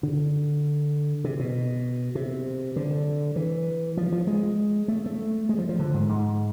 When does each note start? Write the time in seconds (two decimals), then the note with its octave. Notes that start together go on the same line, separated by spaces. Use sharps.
0.03 D3
1.24 C3
1.40 B2
2.15 C3
2.76 D3
3.36 E3
3.97 F3
4.12 F3
4.27 G#3
4.88 A3
5.06 A3
5.49 G#3
5.58 F3
5.69 F3
5.79 D3
5.94 G#2
6.09 G#2